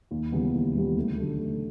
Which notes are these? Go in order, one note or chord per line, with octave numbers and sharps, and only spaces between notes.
D#2
C#3 E3 G3 B3
D#2
C#3 E3 G3 B3
D2
D3 F#3 A3
D2